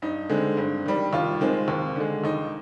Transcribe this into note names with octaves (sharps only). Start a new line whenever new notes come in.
G2 D#4
D3 G#3 C4
G2
D#3 G3
D#2 F4
D#3 G#3 C4
D#2
D3 G#3
D#2 D#4